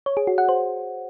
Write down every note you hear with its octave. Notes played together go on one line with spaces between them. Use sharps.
C#5
G#4
F#4
F#5
C5